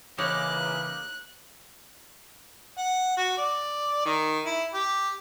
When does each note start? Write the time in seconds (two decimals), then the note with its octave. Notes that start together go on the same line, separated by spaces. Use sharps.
0.18 C#3 E3 A#3 D#4 G4 C#5 F#6
2.78 F#5
3.17 F#4
3.38 D5
4.06 D#3
4.46 E4
4.74 G4